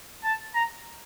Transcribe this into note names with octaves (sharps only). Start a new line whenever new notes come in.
A5
A#5